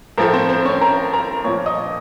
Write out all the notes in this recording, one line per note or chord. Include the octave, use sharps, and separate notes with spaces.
A2 F3 A3 A#4
C4 C5
C4 C5
C#4 C#5
A#4 A#5
A#4 A#5
A#2 F3 A#3 C#5 C#6
D#5 D#6